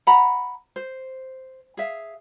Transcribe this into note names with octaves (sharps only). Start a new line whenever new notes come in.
F#5 A#5 B5
C5
G#4 E5 F5